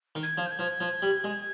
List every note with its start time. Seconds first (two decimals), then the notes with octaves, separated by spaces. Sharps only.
0.15 D#3
0.23 G#6
0.38 F3
0.46 G6
0.51 G#6
0.59 F3
0.81 F3
1.02 G3
1.24 G#3